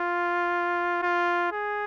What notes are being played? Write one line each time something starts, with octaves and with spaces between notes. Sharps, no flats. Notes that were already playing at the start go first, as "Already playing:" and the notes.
Already playing: F4
F4
G#4